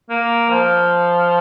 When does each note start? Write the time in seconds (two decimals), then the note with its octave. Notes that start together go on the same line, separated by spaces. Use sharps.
0.09 A#3
0.49 F3